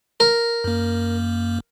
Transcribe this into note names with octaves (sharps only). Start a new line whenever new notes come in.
A#4
F#2 A#3